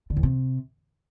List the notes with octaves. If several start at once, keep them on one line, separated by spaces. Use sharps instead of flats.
D3
E2
C3